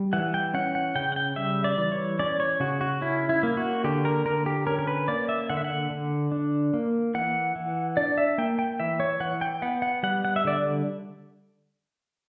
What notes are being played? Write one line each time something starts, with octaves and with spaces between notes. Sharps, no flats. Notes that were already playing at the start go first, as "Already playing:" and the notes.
Already playing: G3
E3 F#5
G5
C#4 F#5
F#5
C#3 G5
F#5
G5
G3 E5
D5
E3
C#5
C#4 D5
C#5
C#3 F#4
F#4
C#4 E4
E4
A#3
F#4
D3 G4
A#4
D3 A#4
G4
C#4 A#4
A#4
B4
A#3 D5
E5
D3 F#5
E5
F#5
D3
D4
A#3
E3 F#5
E3
D4 D5
E5
A#3 G5
G5
E3 E5
C#5
E3 F#5
G5
B3 F#5
F#5
G3 F#5
F#5
E5
D3 D5